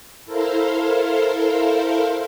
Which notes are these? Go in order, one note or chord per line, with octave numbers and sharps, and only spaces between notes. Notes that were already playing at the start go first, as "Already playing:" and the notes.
E4 A4 A#4 C5 F5